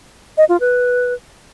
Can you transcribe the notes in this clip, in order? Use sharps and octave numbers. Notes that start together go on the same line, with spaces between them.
D#5
F4
B4